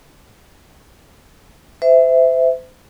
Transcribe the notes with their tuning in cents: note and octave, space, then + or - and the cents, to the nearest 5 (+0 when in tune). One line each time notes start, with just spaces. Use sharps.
C5 -35 E5 +0